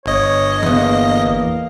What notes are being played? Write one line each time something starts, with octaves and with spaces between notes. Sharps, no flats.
G1 C#5 D#5
E2 A#3 B3